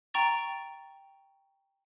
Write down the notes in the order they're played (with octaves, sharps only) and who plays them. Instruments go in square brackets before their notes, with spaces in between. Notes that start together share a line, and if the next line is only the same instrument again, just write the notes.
[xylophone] G5 A#5 C#6 A6